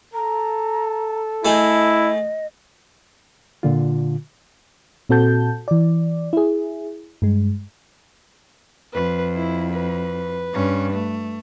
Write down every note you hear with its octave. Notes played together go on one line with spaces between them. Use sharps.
A4 A#5
A3 E4 G#4 D#5
A#2 D3 F4
A#2 C4 F#4 A4 A5 G6
E3 D5
E4 G#4
G2 G#3
F2 B4
E4
B4
G2 C#4
A3